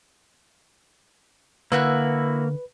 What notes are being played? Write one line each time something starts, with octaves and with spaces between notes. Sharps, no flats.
D3 A#3 E4 F#4 B4 F#6